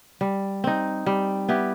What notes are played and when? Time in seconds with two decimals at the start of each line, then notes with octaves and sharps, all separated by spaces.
0.21 G3
0.64 C4 D#4
1.06 G3
1.49 B3 E4 G4